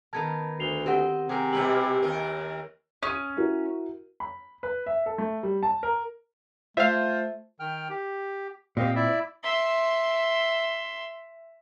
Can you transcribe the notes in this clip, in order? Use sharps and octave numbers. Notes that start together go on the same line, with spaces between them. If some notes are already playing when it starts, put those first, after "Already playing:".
D#3 B3 A#4 A5 G#6
D2 C7 F7 G7
C4 G4 D#5 F#5 G5
C3 G#4 A#4
B2 G3 E4 G4 B4 C#5 F#7
D#2 D#4 A#4
C#4 D#6 D#7
E4 F#4 A#4
B5
B4
E5
A4
A3
G3
A5
A#4
A3 F4 C5 E5 F5
D#3 G5 F6
G4
A#2 C4 G4 D#5 F5
E4 D5 E5
E5 C6